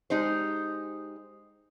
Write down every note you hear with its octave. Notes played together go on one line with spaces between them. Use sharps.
G#3 D#4 G4 C5